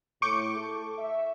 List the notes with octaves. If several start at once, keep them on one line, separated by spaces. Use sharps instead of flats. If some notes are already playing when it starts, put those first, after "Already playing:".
A2 C#6 D6 G6
A4
E5